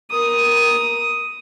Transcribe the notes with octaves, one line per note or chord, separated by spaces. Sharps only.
A#4 D#6